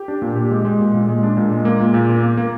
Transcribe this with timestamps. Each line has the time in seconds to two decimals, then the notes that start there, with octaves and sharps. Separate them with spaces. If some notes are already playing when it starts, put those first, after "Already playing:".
Already playing: G4
0.08 D4
0.22 A#2
0.36 G4
0.51 G#3
0.65 G#3
0.79 A#2
0.94 A#2
1.09 G#3
1.23 D4
1.37 A#2
1.52 G#3
1.65 A#3
1.80 A#2
1.94 A#2
2.09 A#3
2.23 A#3
2.37 A#3